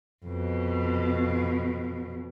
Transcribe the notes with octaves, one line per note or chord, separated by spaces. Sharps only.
F2 B2